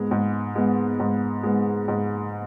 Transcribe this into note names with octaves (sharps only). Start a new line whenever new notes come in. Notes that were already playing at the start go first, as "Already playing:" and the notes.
Already playing: G#2 G#3 B3
G#2
G#3 B3
G#2
G#3 B3
G#2